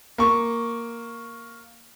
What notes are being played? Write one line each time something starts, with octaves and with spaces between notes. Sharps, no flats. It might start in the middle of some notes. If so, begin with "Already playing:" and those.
A#3 C#6